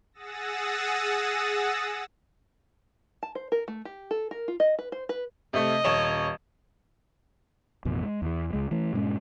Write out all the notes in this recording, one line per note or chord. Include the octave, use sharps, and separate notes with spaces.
G#4 F#5 D#6 E6 A6 A#6
A5
C5
A#4
A3
G4
A4
A#4
F4
D#5
B4
C5
B4
C3 A3 D#5
D#1 C#5 E7
A1 F2 B2
G#3
E2 E3
C#2 G#3
E3 A3
G2 A#2 G#3 C#4